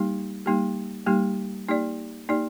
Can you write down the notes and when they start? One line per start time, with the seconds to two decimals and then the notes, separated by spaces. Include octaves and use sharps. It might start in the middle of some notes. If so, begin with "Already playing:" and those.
Already playing: G3 A#3 D#4 G4
0.46 G3 A#3 D#4 G4
1.07 G3 A#3 D#4 G4
1.69 A#3 D#4 G4 D5
2.29 A#3 D#4 G4 D5